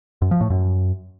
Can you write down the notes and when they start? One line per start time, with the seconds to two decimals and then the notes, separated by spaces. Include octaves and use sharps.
0.22 F#2
0.31 F3
0.41 A2
0.50 F#2